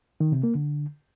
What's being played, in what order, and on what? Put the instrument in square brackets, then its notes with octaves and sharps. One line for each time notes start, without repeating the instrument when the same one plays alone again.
[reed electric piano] D#3
C3
A#3
D3